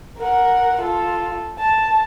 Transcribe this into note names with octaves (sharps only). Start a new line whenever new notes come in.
A#4 F#5
F4 A4
A5